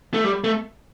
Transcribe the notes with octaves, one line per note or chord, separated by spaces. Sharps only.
A3
G3
A3